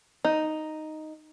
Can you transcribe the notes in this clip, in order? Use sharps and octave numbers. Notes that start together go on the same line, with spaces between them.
D#4